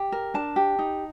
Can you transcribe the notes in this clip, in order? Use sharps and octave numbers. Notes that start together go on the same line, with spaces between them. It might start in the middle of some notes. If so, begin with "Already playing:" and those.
Already playing: G4
A#4
D4 A5
G4
D#4